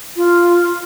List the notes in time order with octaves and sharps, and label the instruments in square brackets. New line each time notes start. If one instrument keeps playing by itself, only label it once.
[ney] F4